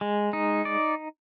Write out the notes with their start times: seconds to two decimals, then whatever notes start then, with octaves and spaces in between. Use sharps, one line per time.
0.01 G#3
0.33 D#4
0.65 D5